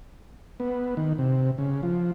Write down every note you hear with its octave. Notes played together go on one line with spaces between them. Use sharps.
B3
D#3
C3
C#3
F3